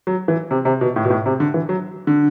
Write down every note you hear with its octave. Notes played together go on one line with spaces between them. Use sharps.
F#3
E3
C3
C3
B2
A2
B2
A2
C3
D3
E3
F#3
D3